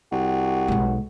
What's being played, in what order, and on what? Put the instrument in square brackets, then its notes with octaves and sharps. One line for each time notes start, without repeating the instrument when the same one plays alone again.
[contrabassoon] C2 [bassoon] F#4
[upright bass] B1 G#3